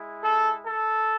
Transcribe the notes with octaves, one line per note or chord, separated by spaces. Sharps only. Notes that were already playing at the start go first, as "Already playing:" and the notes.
Already playing: G#3 E4
A4
A4